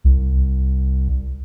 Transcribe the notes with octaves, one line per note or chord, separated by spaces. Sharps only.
C2